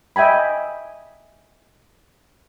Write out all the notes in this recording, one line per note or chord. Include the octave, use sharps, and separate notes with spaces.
D#5 E5 G5 G#5 B5